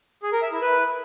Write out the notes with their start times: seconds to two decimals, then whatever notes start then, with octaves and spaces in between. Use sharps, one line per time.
0.23 G#4
0.33 A#4
0.42 E5
0.52 E4
0.62 B4